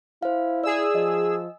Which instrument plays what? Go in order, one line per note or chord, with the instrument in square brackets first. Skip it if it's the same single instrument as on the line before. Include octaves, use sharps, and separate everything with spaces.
[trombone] E4 [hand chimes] C5 F5
[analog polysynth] G#4 E6 [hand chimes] D5
[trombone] F3 [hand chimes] D#5